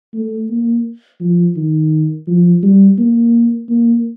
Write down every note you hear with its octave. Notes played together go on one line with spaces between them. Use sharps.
A3
A#3
F3
D#3
F3
G3
A#3
A#3